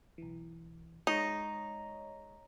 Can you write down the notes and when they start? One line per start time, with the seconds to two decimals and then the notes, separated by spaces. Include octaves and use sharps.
0.18 B1 E3
1.07 G#3 D#4 C#5 D#5